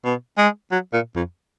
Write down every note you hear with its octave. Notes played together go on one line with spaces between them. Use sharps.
B2
G#3
F#3
A#2
F2